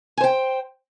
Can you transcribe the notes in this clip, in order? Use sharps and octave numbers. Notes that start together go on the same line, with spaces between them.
C5 G5 G#5